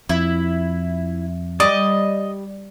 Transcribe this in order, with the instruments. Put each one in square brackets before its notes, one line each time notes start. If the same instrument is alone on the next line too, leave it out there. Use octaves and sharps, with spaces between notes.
[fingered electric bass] F2 [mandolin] E4
[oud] G3 [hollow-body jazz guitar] D5 [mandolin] D#5